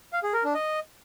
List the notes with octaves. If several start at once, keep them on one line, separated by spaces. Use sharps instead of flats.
F5
G#4
A#4
D4
D#5